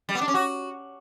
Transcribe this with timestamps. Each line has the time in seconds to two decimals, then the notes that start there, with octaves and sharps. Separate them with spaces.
0.09 G3
0.15 B3
0.21 D4
0.28 C#4
0.34 F#4